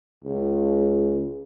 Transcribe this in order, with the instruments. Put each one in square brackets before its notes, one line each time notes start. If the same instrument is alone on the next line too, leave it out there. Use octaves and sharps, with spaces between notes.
[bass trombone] C#2